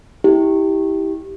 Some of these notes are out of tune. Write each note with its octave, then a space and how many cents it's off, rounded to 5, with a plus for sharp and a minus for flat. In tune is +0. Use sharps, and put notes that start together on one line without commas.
E4 -25 G4 +0